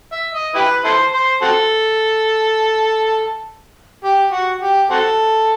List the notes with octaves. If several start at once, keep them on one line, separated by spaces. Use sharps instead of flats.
E5
D#5
E4 G4 B4
E4 A4 C5
C5
C4 F#4 A4
G4
F#4
G4
C4 F#4 A4